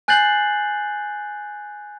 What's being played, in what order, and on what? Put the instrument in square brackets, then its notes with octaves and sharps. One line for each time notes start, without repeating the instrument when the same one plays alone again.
[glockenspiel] G#5 F#6 G6 A6 C7 F#7